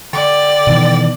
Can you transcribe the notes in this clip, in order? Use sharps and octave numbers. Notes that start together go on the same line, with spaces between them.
D3 D5 G5 A6
B2 D#3 E3